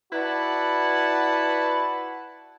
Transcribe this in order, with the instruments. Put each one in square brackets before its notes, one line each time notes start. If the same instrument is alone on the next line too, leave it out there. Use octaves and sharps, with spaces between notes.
[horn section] E4 F#4 B4 D5 F#5 A5